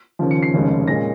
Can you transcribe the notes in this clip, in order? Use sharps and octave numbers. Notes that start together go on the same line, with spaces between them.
D#2 C#3 F3
C#7
C7
F1 D#2 C#3 G#3
A#2 G#3 C#4 A#6